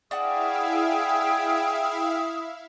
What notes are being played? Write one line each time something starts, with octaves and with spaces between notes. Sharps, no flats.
D4 E4 F#4 G#4 E5 F5 G5 D#6